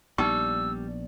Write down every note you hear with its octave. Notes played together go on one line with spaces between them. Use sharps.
A#1 G3 B3 D#4 G5 C#6 E6